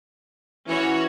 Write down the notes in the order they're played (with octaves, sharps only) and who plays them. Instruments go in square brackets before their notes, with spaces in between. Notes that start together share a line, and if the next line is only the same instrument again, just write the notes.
[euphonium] E3 [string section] C#4 F#4 C#5